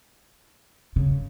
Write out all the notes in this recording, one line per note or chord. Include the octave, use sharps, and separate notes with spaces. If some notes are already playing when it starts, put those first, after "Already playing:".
C#3